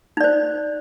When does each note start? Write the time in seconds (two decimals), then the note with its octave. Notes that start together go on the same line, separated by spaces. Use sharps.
0.17 D#4
0.21 D5
0.24 C5